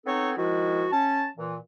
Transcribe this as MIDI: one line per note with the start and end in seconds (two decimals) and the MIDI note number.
0.06 0.31 59
0.06 0.31 60
0.06 0.31 63
0.06 0.31 69
0.06 0.31 73
0.37 0.86 51
0.37 0.86 53
0.37 0.86 56
0.37 0.86 64
0.37 0.86 66
0.92 1.27 61
0.92 1.27 81
1.37 1.56 46
1.37 1.56 52